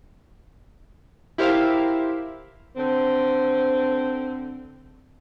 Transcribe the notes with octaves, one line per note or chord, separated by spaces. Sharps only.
E4 G4 A#4 C5 E5 F5
D3 C4